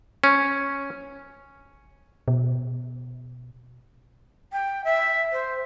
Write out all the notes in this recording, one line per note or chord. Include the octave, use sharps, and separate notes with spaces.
C#4
B2
G5
E5
C5